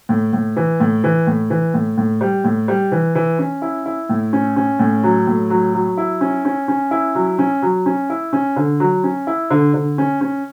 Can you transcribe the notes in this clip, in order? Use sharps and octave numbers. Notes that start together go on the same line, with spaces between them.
A2
A2
E3
A2
E3
A2
E3
A2
A2
G3
A2
G3
E3
E3
C#4
E4
E4
A2
C#4
C#4
A2
F#3
A2
F#3
F#3
E4
C#4
C#4
C#4
E4
F#3
C#4
F#3
C#4
E4
C#4
D3
F#3
C#4
E4
D3
D3
C#4
C#4